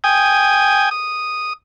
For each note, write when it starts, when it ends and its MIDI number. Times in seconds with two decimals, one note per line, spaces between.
0.04 0.89 79
0.04 0.89 80
0.04 0.89 87
0.91 1.53 87